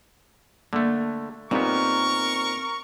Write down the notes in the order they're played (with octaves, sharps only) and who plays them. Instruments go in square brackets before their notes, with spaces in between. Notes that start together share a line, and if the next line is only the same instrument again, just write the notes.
[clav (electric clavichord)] D3 A3 [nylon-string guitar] A#3
[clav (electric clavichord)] A#2 B3 [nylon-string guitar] C4 D#4 G4 [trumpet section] A#4 C#6